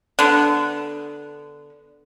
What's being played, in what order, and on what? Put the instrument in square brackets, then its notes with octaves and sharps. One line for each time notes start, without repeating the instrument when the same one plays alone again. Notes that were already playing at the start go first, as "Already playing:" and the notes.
[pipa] D3 B3